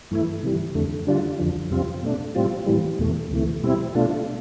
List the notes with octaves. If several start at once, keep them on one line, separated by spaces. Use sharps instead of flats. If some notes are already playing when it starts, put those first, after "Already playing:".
G2 E3 A3 E4
C3 E3 G3
F2 D3 A3
D3 G3 D4 F4
F2 D3 F3
F2 C3 G3 C4 F4
B2 A3 D4
A2 G3 C4 F4
A2 E3 G3
E2 B2 A3
D2 C3 E3 A3
B2 G3 C4 E4
B2 A3 D4 F4